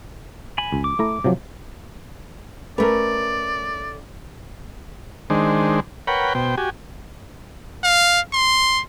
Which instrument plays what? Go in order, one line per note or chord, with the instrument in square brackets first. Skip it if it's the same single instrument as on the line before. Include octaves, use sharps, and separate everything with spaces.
[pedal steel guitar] G#5 B5
[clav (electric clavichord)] C#2
[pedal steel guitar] D6
[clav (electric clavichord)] A3 E4 A#5
C3 F3 F#3
[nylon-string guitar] A3 C#4 [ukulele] A#4 B4 [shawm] D5
[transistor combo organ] D#3 G#3 D4 C5
A#4 B4 C#5 F#5 G5 B5
B2 C5 G5
F#4 G4 G#5
[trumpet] F5
C6